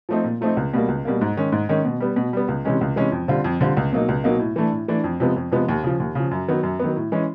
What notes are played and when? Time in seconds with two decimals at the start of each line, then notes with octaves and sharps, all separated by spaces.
0.09 F3 A3 C4 D#4
0.24 A#2
0.41 F3 A3 C4 D#4
0.57 C#2
0.74 B2 G3 A#3
0.88 C#2
1.05 B2 G3 A#3
1.21 G#2
1.37 D#3 G#3 C#4
1.52 G#2
1.69 D#3 G#3 C#4
1.85 B2
2.00 G3 B3
2.16 B2
2.33 G3 B3
2.48 C#2
2.65 C3 E3 G#3 C#4
2.81 C#2
2.96 C3 E3 G#3 C#4
3.12 F2
3.28 D3 G3 C4 F4
3.44 F2
3.61 D3 G3 C4 F4
3.77 C#2
3.93 B2 F#3 A#3 D#4
4.08 C#2
4.24 B2 F#3 A#3 D#4
4.40 A2
4.56 E3 A3 D4
4.72 A2
4.88 E3 A3 D4
5.04 F2
5.20 C3 F3 G#3 B3
5.36 F2
5.52 C3 F3 G#3 B3
5.69 D#2
5.83 C#3 F3
6.00 D#2
6.15 C#3 F3
6.31 F#2
6.48 D#3 F#3 B3
6.63 F#2
6.80 D#3 F#3 B3
6.96 A2
7.12 E3 G#3 C#4